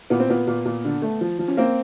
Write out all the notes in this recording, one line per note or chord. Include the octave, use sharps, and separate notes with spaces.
A#2 B3
C4
A#2 B3
A#2
A#2
D3
A3
F3
F3
C#4
A#3 C4